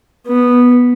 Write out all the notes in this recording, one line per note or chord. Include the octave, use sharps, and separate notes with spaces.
B3